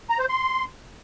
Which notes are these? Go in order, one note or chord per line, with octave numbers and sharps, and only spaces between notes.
A#5
C5
C6